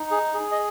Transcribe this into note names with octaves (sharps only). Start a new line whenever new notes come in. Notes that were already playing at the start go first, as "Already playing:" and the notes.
Already playing: D#4
G#4
G#4
D#5